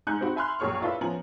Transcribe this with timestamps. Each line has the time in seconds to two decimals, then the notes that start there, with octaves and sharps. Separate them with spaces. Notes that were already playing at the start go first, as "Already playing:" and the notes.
0.07 G#2 D#4 G#5 F#6 G6 C#7
0.21 C4 D#4 F#4 B5
0.36 E5 G#5 B5 C6 F6 F#6
0.59 A#1 F#2 G#4 C#5 C#6 F6
0.81 D4 E4 F4 A4 B4 E5
1.01 F3 B3 C#4 G#5 A#5 F#7